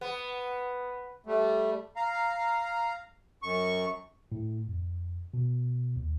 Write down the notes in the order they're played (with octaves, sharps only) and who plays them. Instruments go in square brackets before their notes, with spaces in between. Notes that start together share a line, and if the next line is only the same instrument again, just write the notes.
[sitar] B3
[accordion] G3 A3
F5 A#5
F#2 C#6
[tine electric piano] A2
F2
B2
D#2